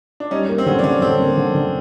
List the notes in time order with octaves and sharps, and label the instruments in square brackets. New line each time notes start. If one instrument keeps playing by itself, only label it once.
[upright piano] D4
[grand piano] G3 [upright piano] C#4 D#4
[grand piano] A#3
[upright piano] C4
[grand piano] D3 [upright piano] C#4
[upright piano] D4
[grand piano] D3 [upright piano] C#4
[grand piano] D3 [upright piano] C4
[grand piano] A#3
D3
D3